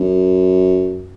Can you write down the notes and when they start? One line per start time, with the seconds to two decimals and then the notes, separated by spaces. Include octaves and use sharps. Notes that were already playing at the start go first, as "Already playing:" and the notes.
Already playing: F#2